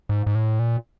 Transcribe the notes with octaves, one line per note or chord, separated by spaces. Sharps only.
G#2
G#2
A2
A#2